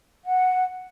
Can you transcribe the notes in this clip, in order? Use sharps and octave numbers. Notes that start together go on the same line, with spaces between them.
F#5